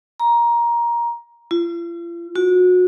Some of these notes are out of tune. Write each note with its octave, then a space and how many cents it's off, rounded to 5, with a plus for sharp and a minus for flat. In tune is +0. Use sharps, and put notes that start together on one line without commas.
A#5 +15
F4 -40
F#4 -30